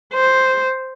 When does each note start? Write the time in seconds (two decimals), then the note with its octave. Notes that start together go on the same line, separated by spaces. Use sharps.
0.14 C5